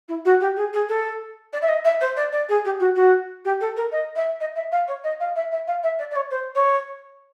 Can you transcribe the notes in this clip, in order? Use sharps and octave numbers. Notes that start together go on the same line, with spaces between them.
E4
F#4
G4
G#4
G#4
A4
D5
E5
D#5
E5
C5
D5
D5
G#4
G4
F#4
F#4
G4
A4
A#4
D#5
E5
D#5
E5
F5
C#5
D#5
F5
E5
E5
F5
E5
D5
D5
C#5
C5
C#5